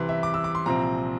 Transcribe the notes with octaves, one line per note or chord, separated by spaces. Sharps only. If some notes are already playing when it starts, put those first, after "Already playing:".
Already playing: C2 C3 E3 C6
E5
D6
E6
D6
C6
C2 A#2 F3 C4 A#5